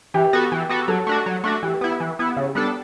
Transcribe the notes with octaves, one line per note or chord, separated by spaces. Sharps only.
E3 G4
B3 F#4 A4
E3
B3 F#4 A4
F#3 A4
A3 D4 F#4
F#3
A3 D4 F#4
E3 G4
B3 E4
E3
B3 E4
C#3
G3 B3 D4 A4